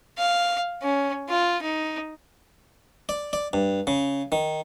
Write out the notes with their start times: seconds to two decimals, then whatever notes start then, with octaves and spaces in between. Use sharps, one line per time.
0.17 F5
0.82 C#4
1.29 F4
1.62 D#4
3.09 D5
3.33 D5
3.53 G2
3.87 C#3
4.32 D#3